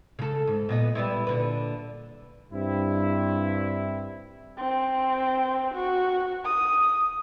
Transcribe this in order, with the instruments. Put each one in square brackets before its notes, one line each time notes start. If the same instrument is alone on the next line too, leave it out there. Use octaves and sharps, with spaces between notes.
[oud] C#3 A4
G#2
A#2 B3 D#5
G3 B3 E4
A#2 D3 B4
[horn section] G2 C4 E4
[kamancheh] C4
F#4
D#6